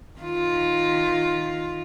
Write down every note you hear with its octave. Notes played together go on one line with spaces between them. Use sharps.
D#3 F4